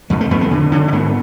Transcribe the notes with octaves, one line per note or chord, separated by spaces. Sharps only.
F2 G#3
A3
F2 B3
B3
D3
D3 C#4
C#4
G#2 B3